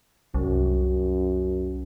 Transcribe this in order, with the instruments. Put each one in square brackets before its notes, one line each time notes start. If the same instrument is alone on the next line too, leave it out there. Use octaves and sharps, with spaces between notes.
[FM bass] C2 [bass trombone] F#2